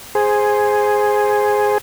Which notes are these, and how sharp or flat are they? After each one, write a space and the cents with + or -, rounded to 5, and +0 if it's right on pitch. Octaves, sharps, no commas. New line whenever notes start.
G#4 +0 C5 +0